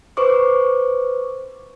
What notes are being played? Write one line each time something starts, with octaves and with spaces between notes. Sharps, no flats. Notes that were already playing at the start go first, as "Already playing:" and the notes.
B4 C5 C#6 D6